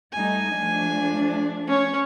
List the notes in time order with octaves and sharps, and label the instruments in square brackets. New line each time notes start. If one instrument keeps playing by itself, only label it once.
[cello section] G3 A3 D#4 [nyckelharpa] G#5
[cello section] F3 A3 D4
[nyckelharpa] C#4 C#5